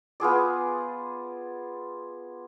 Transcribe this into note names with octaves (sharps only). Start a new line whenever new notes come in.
B3 F4 G#4 D5